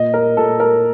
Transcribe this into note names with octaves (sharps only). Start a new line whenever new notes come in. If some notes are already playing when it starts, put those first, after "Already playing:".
Already playing: A#2 D#5
A#4
A#2 A4
A#4